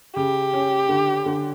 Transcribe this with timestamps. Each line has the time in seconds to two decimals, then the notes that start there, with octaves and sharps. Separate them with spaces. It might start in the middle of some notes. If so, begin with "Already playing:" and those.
0.16 C#3 G4
0.53 C#4
0.89 D3
1.26 D3